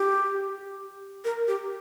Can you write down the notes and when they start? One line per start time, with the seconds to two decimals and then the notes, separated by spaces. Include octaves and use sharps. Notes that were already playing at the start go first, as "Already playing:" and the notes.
Already playing: G4
1.25 A#4
1.48 G4